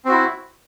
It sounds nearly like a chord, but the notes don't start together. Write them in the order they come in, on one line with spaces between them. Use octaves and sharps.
C4 F#4 E4